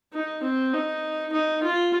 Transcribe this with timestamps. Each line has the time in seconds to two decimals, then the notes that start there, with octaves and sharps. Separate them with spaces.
0.13 D#4
0.43 C4
0.73 D#4
1.32 D#4
1.63 F4